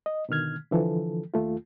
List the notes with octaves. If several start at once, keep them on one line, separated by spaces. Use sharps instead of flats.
D#5
B2 D3 D#3 F6 G#6
D3 E3 F3 A4
D#2 A3 F4